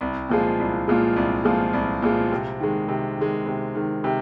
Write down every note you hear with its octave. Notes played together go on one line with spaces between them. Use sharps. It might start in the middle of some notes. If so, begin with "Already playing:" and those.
C2
A#2 F3 G#3
C2
A#2 F3 G#3
C2
A#2 F3 G#3
C2
A#2 F3 G#3
C3
D#3 G#3
C3
D#3 G#3
C3
D#3 G#3
C3